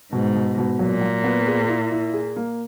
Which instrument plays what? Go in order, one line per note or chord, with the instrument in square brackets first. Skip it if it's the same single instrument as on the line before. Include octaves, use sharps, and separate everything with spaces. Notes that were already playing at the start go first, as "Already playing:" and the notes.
[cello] G#2 [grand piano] B2
[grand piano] B2
B2
[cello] A#2 [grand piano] F#3
[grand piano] F#3
B3
G#4
E4
E4
G#4
A#3